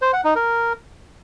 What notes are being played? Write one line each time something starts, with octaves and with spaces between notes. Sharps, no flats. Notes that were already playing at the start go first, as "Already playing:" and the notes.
C5
F#5
D#4
A#4